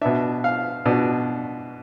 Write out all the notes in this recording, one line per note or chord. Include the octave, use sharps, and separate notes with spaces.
B2 B3 D4 E5
F5
B2 B3 D4